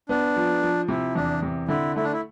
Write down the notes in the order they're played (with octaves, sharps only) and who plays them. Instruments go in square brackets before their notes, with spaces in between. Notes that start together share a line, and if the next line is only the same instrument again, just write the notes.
[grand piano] B3 [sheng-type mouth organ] D4
[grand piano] F3
F3
[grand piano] C3 [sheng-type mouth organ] E4
[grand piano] E2 [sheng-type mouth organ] D4
[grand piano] C3
[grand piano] D3 [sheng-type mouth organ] E4
[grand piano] A3 [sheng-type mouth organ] E4
[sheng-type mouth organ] D4
E4